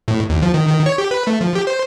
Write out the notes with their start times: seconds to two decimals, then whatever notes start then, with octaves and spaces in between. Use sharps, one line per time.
0.08 A2
0.29 D#2
0.42 F3
0.54 D#3
0.67 D#3
0.86 C#5
0.98 G4
1.11 B4
1.27 A3
1.41 F3
1.55 G4
1.67 C5